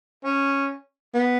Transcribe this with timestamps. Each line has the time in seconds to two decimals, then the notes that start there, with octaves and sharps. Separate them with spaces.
0.24 C#4
1.14 B3